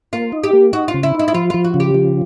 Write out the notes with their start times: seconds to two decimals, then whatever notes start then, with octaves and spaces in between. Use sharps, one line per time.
0.13 A#3 F4
0.32 D#4
0.44 G4
0.53 A#3
0.73 D#4 F#4
0.88 F4
0.94 C#3
1.03 E4
1.15 D#4 E4
1.28 E4
1.34 F3 F4
1.50 F3 F4
1.64 F#4
1.74 C#3
1.80 G4
1.95 F3